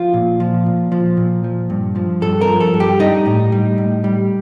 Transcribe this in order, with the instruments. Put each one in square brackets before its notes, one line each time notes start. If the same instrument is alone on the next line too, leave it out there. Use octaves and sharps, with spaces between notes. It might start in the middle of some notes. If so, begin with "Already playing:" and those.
Already playing: [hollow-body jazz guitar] F3 F4
A#2
F3
A#2
F3
A#2
F3
G2
F3
G2 A4
A#4
F3
A4
G2
G4
G3 D#4
A2
G3
A2
G3